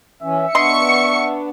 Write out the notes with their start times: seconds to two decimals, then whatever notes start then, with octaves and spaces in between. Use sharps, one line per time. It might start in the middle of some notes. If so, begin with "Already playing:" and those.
0.23 E3 C#4 E5
0.55 B3 D4 D#5 C6 C#6 C#7